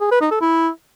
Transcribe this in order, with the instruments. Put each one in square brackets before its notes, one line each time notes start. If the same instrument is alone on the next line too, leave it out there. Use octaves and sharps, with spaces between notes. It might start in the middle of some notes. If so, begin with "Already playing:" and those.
[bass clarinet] G#4
B4
D#4
A4
E4